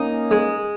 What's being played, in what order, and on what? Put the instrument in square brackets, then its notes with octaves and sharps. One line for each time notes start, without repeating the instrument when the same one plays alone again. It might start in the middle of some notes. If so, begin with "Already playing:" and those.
Already playing: [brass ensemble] A#3 C#4 [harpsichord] D#4
[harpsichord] G#3